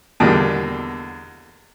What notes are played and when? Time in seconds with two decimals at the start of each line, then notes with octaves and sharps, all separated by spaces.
0.20 E2 B2 D3 G3 A#3